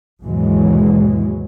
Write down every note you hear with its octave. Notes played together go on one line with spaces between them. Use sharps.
D#2 G#2 B2 E3 F#3 G#3